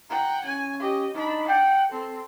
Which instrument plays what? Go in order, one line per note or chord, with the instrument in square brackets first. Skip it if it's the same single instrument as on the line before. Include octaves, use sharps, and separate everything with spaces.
[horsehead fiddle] F#5 G5 [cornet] A#5
[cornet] C#4 [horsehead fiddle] G#5
[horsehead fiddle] G4 D#5
[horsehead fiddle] D4 B5 [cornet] D#4
[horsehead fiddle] F#5 [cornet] G5
[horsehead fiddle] C4 [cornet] A4